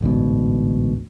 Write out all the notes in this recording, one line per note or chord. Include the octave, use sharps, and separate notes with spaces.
A1 D2 G#2 B2